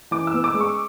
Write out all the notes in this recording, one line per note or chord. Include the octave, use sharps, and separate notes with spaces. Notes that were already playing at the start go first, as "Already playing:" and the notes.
E3 D6
E6
B3
D6
G#3
C#6